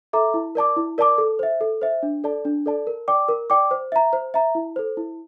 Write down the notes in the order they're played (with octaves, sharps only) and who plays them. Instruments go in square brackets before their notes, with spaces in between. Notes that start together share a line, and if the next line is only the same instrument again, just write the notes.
[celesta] A4 E5 A#5 D6
E4
A#4 D5 A5 D6
E4
A#4 D5 A5 D6
A4
C5 E5
A4
C5 E5
D4
A4 D5 A5
D4
A4 D5 A5
A#4
D5 G5 D6
A#4
D5 G5 D6
C5
E5 A#5
C5
E5 A#5
E4
A4 C5
E4